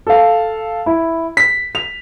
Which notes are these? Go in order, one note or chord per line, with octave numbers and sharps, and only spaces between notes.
A4 F5
E4
B6
F7